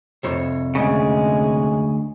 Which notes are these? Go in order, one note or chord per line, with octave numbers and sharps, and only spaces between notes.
C2 F2 C#5
D2 G#2 C#3 G#3